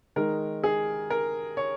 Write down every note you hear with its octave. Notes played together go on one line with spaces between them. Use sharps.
D#3 G#3 D#4 A#4
G#4
A#4
C#5